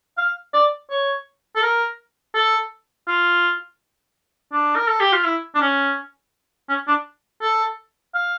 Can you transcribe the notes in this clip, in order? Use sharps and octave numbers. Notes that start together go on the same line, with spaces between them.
F5
D5
C#5
A4
A#4
A4
F4
D4
A#4
A4
G4
F4
E4
D4
C#4
C#4
D4
A4
F5